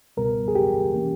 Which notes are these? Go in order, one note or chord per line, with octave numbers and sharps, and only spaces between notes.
C#2 B2 G3 B3 A#4
G#4
G4
E3 A#3 C#4